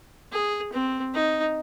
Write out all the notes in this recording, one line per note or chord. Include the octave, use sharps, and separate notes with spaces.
G#4
C4
D#4